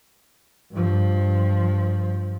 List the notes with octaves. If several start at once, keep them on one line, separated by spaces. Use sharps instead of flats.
G2 F3